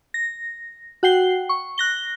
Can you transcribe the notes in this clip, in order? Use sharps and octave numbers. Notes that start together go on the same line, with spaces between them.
A#6
F#4 F#5 G5 C7 G7
C#6
F#6 A#6 G7